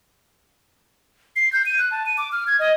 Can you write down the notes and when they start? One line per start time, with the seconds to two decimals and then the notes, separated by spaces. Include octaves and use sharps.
1.36 C7
1.53 G6
1.66 D#7
1.79 F#6
1.91 A5
2.06 D#7
2.18 D6
2.32 F6
2.47 G#6
2.59 D#5